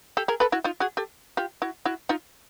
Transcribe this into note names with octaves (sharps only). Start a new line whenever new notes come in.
G4 A4
G#4 A#4
A4 B4
E4 F#4
D#4 F4
F#4 G#4
G4 A4
F4 G4
E4 F#4
E4 F#4
D#4 F4